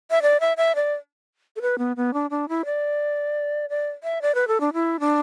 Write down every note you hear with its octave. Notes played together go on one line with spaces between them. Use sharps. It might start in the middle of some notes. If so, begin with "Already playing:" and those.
E5
D5
E5
E5
D5
A4
B4
B3
B3
D4
D4
E4
D5
D5
E5
D5
B4
A4
D4
E4
D4